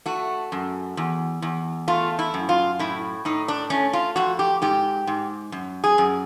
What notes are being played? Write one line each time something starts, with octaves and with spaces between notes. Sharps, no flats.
A3 F#4
F#2
E2
E2
A3 F4
E4
F#2
F4
A2 E4
A2 D#4
D4
A3 C#4
F4
F2 F#4
G4
G#2 G4
G#2
F#2
G#4
F#2